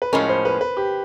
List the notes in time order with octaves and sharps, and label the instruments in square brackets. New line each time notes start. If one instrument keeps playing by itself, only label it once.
[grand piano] B4
[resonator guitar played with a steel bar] A2 F3 G#3 C#4 [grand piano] A#4
[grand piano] C5
B4
B4
G4